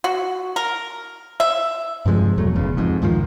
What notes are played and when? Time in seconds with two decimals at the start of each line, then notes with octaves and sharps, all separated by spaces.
0.04 F#4
0.56 A#4
1.40 E5
2.06 G2 C3 F3 G#3
2.38 E2 B2 F#3 A3
2.56 F1 E2 C#3
2.77 F2 G#2
3.02 C#2 G#2 D#3 F3